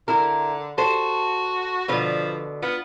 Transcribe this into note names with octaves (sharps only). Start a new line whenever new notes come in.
D3 E4 A#4
F#4 A4 C5
B2 D3 F3 B4
B3 F4